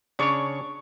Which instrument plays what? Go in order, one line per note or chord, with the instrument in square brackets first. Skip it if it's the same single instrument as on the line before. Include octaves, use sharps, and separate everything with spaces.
[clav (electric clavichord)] C#3 D4 C#5 [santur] C#6 D6